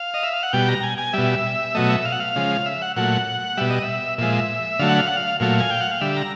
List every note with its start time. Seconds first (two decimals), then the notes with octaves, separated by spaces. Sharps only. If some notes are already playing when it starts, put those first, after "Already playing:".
Already playing: F5
0.14 D#5
0.23 E5
0.33 F5
0.43 F#5
0.53 B2 G3 G5
0.68 A#5
0.83 G#5
0.98 G#5
1.13 B2 G3 E5
1.75 B2 F#3 A3 D#5
1.90 E5
2.05 F5
2.12 F#5
2.20 F5
2.36 C#3 F3 G#3
2.66 E5
2.82 F#5
2.96 A#2 F#3 A3 F#5
3.57 B2 G3 E5
3.70 D#5
3.83 E5
4.18 A#2 F3 G#3 E5
4.79 D3 F#3 A3 F5
4.89 F#5
4.98 F5
5.07 F#5
5.17 F5
5.40 A#2 F#3 A3 F5
5.60 G#5
5.70 G5
5.81 F#5
5.91 F5
6.01 D3 G3 E5
6.17 A#5